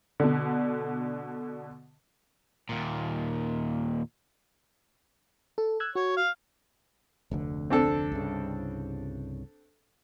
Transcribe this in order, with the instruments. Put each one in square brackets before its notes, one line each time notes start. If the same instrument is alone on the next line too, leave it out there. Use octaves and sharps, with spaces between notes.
[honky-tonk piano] B2 D3
[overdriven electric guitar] D#2 A#2
[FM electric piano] A4
E6 F#6 G#6
[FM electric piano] F#4 [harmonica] C#5
[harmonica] F5
[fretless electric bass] F1 D2 D3
[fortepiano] C4 D4 A4
[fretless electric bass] C2 G2 C#3